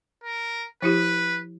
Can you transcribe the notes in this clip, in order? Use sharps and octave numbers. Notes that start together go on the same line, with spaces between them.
A#4
F3 E4 G4 B4